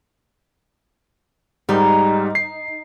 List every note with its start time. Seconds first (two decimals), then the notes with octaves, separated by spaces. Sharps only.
1.69 G#2 G3 D#4
2.35 C7